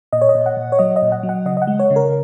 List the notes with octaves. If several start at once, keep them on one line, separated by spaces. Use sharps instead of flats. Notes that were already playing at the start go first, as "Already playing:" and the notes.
A#2 D#5
C#5
D#5
A#2
F#5
A#2
C#5
F#3 D#5
D#5
A#2
F#5
F#3
F#5
C#3 D#5
D#5
F#5
G#3
C#5
C#3
A#4